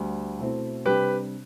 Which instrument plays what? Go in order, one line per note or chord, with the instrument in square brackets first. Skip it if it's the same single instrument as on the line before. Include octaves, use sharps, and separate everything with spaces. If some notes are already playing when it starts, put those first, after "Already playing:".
Already playing: [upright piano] D2 D3 G3
B2 A3 C4 E4
[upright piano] C3 G3 D4 [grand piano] G4 B4